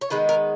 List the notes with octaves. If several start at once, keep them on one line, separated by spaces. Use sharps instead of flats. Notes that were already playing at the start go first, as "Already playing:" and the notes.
C#5
D#3 G#3 B3 B4
A#4